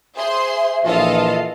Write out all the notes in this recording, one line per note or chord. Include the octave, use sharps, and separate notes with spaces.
G#4 C5 E5 C6
A#1 E3 F4 A4 D#5 F5